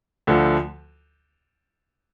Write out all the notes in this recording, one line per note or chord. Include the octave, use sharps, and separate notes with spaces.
D2 D3 F3